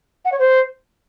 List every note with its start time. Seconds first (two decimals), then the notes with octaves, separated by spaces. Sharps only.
0.25 F#5
0.32 C#5
0.39 C5